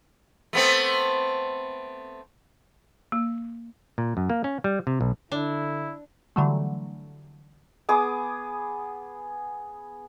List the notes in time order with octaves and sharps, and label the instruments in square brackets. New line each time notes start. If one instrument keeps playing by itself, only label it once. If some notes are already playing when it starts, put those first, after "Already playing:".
[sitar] A3 B3 C4
[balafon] A#3
[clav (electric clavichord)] A#2
F#2
A#3
C#4
G3
C3
B1
[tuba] D3 [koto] D4 [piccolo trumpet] E4
[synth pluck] D3 E3 F#3 G3 A3
[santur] B3 G#4 D6 D#6